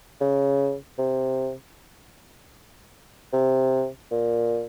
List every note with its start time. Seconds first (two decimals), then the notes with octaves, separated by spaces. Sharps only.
0.21 C#3
0.99 C3
3.33 C3
4.11 A#2